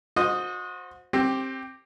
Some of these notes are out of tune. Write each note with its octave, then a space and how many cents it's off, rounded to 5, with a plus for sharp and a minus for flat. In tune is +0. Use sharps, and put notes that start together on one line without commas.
F#4 -35 C5 +0 D#5 +0
C4 +20 G4 +0